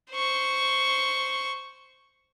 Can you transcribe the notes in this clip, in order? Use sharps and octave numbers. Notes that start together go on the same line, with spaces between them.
C5 C#6